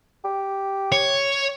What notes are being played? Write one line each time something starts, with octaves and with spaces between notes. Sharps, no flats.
G4
C#5